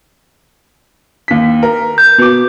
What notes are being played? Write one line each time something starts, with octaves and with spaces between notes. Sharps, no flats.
D#2 B6
A#4
G6
B2 D6